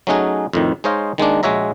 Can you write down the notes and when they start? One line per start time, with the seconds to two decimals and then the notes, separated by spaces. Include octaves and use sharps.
0.07 F#3 A3 C#4 D#4 F#4 G#4
0.53 F2 A2 D#3
0.84 G#3 D#4 C5 C#5 D#5 F5
1.18 D#3 G#3 A#3 D4
1.43 A#1 G#3 F#4 C#5 E5 A#5